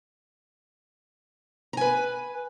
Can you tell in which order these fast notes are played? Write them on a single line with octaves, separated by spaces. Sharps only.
A#5 G#5 B4